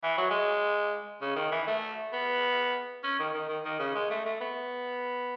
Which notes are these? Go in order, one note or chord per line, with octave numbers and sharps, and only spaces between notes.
E3
F#3
G#3
C#3
D#3
E3
A3
B3
C#4
D#3
D#3
D#3
D#3
C#3
G#3
A3
A3
B3